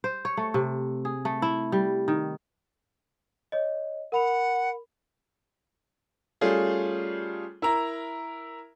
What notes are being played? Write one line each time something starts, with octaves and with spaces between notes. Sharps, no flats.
C5
C#5
A3
C3
G#4
A3
E4
G3
D#3
C#5 D#5
A#4 F#5 B5 F7
G3 A3 C#4 F4 G#4
E4 A#4 A#5